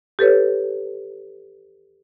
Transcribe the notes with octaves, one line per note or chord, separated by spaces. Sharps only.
G4 A4 B4 C#5